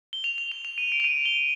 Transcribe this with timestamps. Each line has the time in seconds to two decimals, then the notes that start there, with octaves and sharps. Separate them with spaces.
0.13 G7
0.24 F7
0.38 F7
0.52 F7
0.65 F7
0.78 D#7
0.92 D7
1.00 F7
1.04 D#7
1.25 G7